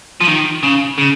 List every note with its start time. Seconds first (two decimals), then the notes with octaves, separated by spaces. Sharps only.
0.21 F3
0.28 D#3
0.63 C#3
0.98 C#3